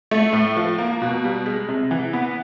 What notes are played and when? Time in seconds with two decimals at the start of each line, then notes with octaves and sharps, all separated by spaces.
0.11 A3
0.33 A2
0.57 F3
0.78 A#3
1.02 B2
1.24 G3
1.46 G#3
1.69 C3
1.91 E3
2.13 B3